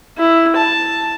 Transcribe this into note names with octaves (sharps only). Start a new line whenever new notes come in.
E4
A5